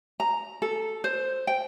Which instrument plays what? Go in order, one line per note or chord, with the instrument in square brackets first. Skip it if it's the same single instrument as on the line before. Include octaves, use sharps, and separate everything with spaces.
[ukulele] A#5
A4
C5
G5